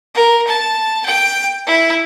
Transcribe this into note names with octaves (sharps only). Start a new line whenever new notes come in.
A#4
A5
G5
E4